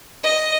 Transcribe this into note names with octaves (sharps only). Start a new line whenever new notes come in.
D#5